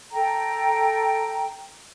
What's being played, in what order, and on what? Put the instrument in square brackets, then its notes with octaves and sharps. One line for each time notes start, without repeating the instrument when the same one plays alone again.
[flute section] A4 G5 A#5